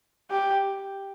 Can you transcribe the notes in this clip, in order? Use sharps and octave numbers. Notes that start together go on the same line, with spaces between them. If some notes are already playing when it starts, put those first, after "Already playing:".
G4